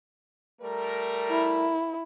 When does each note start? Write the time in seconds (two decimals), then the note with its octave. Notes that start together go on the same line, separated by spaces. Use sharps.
0.61 G3 A3 A#4
1.29 E4